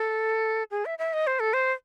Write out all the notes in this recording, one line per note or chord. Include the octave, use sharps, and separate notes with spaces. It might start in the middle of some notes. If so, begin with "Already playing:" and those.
Already playing: A4
G#4
E5
E5
D#5
C5
A4
C5